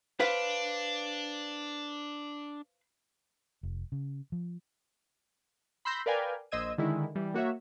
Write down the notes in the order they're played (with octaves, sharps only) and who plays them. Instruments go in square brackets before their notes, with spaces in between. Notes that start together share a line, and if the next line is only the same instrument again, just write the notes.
[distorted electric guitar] D4 [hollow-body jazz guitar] B4 C5 F5
[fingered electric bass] F1
C#3
F3
[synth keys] B5 C6 E6 G6 A#6
A#4 B4 D5 F5 G5 G#5
A#1 C5 D#5 E6 G#6 D#7
D3 D#3 G#3 E4
E3 G3
A#3 F#4 C#5 E5